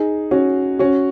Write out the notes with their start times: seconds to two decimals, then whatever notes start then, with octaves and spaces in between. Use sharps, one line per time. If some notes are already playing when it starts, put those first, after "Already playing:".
Already playing: D#4 G#4
0.31 C#4 F#4
0.79 C#4 F#4